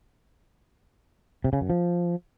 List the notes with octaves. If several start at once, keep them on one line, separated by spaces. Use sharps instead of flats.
C3
C#3
F#2
F3